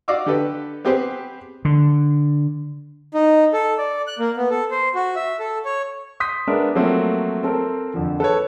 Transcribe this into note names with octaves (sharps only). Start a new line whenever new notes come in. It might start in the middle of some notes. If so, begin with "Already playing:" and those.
F#4 D5 D#5 F5 D6 E6
D3 G4 A4 B4
B3 C4 G4 G#4 B4 C5
D3
D#4
A4
D5
F#6
A#3
B3
A4
C5
F#4
E5
A4
C#5
C6 D#6 G6 B6
G#3 B3 D4 A#4 E5
F3 F#3 A3 A#3 C4
C4 A4 A#4 C5
F2 D3 F3
A4 B4 C#5